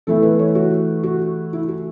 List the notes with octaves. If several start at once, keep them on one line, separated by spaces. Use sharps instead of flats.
E3 A3 E4 A4
B4
C#5
F#4
F#4
E4
F#4